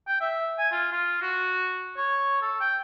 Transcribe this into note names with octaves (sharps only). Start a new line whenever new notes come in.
G5
E5
G#5
F4
F4
F#4
C#5
A4
G5